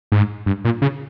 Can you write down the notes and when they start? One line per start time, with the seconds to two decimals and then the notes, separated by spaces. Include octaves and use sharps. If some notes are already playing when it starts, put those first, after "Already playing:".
0.12 G#2
0.46 G2
0.65 A#2
0.82 C#3